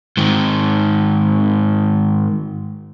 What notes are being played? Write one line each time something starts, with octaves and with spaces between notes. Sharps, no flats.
G#2 D#3